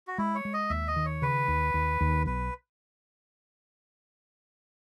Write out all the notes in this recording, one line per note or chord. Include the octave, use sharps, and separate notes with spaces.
F#4
G#3 E4
C#5
G#3
D#5
D#2 E5
D#5
D#3
C#5
C#3 B4
D#2
D#2
D#2
B1 B4